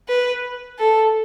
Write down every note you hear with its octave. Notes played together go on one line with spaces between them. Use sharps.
B4
A4